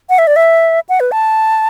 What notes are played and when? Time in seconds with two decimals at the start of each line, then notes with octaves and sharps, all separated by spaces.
0.10 F#5
0.18 E5
0.27 D5
0.36 E5
0.89 F#5
1.00 B4
1.12 A5